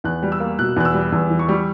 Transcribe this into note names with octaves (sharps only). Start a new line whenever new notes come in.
E2 F#6
G3
E6
A#3
B2 F#6
E2 F#6
E6
G3
E2
E3
C#6
G3